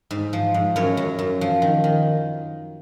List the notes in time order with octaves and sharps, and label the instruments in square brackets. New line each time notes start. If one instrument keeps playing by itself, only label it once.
[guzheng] G#2
F3
G#2
F#2 A#4 C#5
F#2
F#2
F3
D#3
D#3